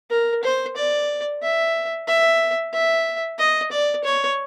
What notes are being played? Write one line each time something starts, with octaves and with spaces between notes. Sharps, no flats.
A#4
C5
D5
E5
E5
E5
D#5
D5
C#5